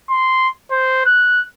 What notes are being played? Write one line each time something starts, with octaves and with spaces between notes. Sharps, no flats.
C6
C5
F#6